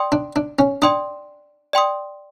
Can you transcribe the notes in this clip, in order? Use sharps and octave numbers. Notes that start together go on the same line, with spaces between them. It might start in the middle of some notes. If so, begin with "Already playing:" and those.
Already playing: D5 G5 C6 D#6
D4
D4
C#4
D4 D5 G5 C6 D#6
D5 G5 C6 D#6